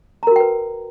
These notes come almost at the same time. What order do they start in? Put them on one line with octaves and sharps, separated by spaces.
A#5 A#4 F#4 G5 B4